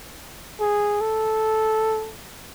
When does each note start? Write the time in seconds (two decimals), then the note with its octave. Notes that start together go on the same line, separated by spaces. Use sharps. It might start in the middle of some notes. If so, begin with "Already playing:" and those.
0.60 G#4
1.01 A4